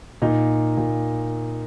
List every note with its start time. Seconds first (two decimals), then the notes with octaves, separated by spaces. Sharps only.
0.22 A#2 D#4
0.77 A#2